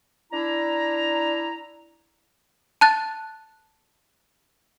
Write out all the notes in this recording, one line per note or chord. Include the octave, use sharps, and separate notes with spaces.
D4 E4 A#5
A5 F#6 A6